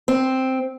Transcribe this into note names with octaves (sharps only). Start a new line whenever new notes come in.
C4